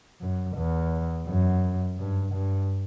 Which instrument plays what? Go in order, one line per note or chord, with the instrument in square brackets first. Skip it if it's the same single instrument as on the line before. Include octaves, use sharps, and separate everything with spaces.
[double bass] F#2
E2
F#2
G2
G2